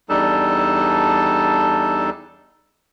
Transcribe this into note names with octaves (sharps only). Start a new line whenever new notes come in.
E2 G3 D4 D#4 A4 A5